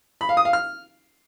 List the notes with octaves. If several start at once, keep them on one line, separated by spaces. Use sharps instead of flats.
B5
F5
D#6
F5
F6